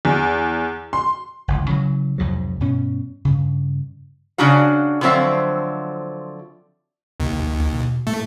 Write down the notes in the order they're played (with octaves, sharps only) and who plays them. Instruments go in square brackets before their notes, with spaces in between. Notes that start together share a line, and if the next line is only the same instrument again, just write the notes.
[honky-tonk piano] E2
C6
[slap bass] G1 C#2 E3
C#3 E3 F#3
C2 F2 G#2 F#3
G2 B2 C#4
G2 C#3
[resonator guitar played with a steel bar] C#3 C#4 D4 F#4 F5
D3 F3 F#3 C4 E5 F5
[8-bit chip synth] D#2 [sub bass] C3
[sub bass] D2
B2
[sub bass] A2 [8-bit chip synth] A3